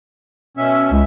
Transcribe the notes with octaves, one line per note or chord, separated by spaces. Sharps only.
B2 C#4 E5
C#2